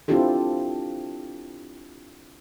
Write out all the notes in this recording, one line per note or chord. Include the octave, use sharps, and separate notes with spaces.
C4 D4 E4 F4 G4 A4